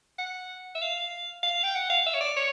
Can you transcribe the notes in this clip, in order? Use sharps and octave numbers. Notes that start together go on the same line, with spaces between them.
F#5
E5
F5
F5
G5
F#5
F5
E5
C#5
D5
C#5